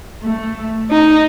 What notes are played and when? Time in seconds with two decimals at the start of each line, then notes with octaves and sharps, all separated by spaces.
0.23 A3
0.90 D#4